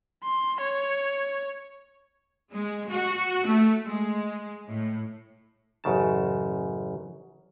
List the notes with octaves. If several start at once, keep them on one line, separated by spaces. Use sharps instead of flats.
C6
C#5
G#3
F#4
A3
G#3
A2
A1 F#2 C#3 A5